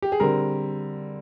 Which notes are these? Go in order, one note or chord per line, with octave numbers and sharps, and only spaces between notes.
G4
G#4
D3 G3 C4 A#4